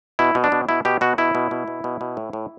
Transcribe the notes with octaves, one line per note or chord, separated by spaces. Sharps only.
B2 E4
B2
D4
B2
B2 E4
B2 G4
B2 F#4
B2 E4
B2
B2
B2
B2
B2
A2
A2